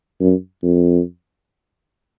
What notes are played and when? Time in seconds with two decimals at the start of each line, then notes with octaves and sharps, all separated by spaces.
0.20 F#2
0.62 F2